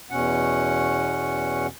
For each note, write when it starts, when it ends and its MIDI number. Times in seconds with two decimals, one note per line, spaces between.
0.11 1.67 40
0.11 1.67 47
0.11 1.67 61
0.11 1.67 78